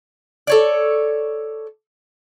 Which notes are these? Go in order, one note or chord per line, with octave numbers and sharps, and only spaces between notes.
A4 C#5 D5